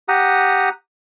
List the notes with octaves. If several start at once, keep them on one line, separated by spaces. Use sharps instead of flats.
G4 F#5 A#5 D#6